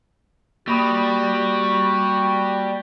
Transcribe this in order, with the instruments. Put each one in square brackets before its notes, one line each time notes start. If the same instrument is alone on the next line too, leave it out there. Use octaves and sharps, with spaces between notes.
[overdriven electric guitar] G3 [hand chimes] A#3 B5 D#6 [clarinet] F#4